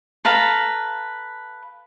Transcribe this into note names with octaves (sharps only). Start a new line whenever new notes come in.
A4 B4 F5 A#5